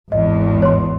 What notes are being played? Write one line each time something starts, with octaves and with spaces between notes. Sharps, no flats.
G#1 E2 D#5
C#5 C6